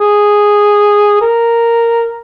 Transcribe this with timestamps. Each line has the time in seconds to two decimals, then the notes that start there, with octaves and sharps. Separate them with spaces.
0.01 G#4
1.21 A#4